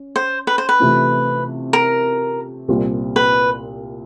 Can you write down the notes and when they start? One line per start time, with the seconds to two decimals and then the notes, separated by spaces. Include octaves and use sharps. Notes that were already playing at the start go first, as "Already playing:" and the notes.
Already playing: C#4
0.16 C5
0.47 B4
0.58 C5
0.69 B4
0.80 C3 E3 A3 C4 F4
1.73 A#4
2.68 C2 A#2 G3 C4 F4
3.16 B4